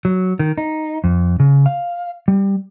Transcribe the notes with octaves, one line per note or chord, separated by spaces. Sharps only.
F#3
D#3
D#4
F2
C#3
F5
G3